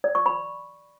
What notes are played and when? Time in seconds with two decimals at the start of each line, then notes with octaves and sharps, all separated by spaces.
0.04 D5
0.15 C#6
0.26 B5